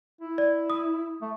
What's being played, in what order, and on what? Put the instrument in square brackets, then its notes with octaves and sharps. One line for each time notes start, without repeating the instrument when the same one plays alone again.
[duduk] E4
[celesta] D5
D#6
[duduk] A3